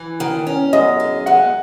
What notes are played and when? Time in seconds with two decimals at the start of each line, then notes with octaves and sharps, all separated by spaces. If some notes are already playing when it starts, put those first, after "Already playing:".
Already playing: E3
0.20 D#3
0.47 C#4
0.73 F#2 D#5
1.00 G#3
1.26 G#3 F#5